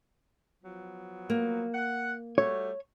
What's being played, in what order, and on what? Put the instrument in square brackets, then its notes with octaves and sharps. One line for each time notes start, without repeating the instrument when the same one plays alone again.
[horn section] F3 F#3 B3
[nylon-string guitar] A#3
[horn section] F#5
[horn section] G3 A3 F#4 [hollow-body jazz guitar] C#5